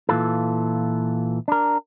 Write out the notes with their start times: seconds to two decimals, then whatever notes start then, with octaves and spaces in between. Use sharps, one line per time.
0.09 A#2 E3 F4 A4
1.48 D4 A#4